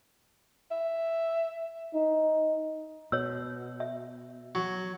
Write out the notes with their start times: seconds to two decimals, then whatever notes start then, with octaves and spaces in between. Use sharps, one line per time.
0.71 E5
1.94 D#4
3.12 B2 C#5 E6
3.80 E5
4.55 F#3